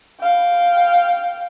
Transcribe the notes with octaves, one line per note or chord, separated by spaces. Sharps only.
F5 G5